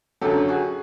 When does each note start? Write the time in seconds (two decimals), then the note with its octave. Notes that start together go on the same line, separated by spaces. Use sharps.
0.21 F#2 D3 F#3 G4 A4
0.48 F#4 G#4